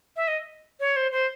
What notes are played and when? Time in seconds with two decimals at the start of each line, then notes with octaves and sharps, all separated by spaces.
0.16 E5
0.28 D#5
0.80 C#5
0.96 C5
1.12 C5